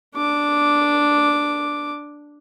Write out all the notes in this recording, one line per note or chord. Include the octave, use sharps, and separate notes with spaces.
D4 D6